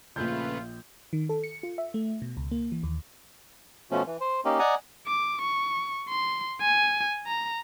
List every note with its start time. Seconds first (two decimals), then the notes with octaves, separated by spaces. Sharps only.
0.16 A#1 C#3 A3 F4 B4 G6
1.13 D#3
1.29 A4
1.43 C#7
1.63 F4
1.78 E5
1.94 A3
2.22 B2
2.37 C#2
2.51 A#3
2.72 E3
2.83 D#2
3.91 B2 F3 A3 C#4
4.06 E3
4.21 C5
4.45 A#3 C#4 D#4 G4
4.59 D5 D#5 F#5 G#5 A#5 D#6
5.07 D6
5.42 C#6
6.09 C6
6.61 G#5
7.27 A#5